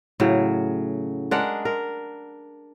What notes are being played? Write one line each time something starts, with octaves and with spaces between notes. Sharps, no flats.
A2 C#3 F#3
G#3 D4 A#4 F#5
A#4